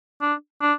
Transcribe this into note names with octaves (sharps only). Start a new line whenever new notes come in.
D4
D4